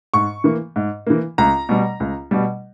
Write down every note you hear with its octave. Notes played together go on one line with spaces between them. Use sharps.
G#2 C#6
E3 A#3
G#2
E3 A#3
C#2 A#5
B2 G3
C#2
B2 G3